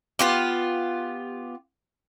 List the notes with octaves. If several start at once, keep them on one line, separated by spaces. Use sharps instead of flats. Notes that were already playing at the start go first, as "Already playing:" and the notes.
B3 F4 G4